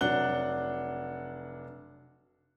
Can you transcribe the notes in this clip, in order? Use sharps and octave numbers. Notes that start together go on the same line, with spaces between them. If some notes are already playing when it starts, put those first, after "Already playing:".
F1 F#3 D4 F#5 F#6 G7